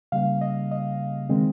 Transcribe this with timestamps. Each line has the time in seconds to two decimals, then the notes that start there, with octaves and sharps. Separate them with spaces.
0.12 C#3 G3 A#3 F5
0.41 D#5
0.71 D#5
1.29 D#3 G#3 C4